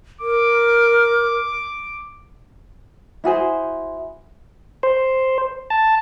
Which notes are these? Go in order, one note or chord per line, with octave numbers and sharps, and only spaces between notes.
A#4 D6
E4 F#4 G#4 C5
C5
A5